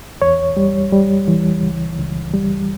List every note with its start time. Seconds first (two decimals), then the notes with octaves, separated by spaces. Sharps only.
0.22 E2 C#5
0.57 G3
0.92 G3
1.28 E3
1.63 C#2
1.98 C#2
2.33 G3